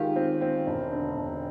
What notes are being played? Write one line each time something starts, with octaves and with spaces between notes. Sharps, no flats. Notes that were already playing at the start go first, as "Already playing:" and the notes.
Already playing: D#3 G#3 F4 G4
C4
C4
E1
D3
E1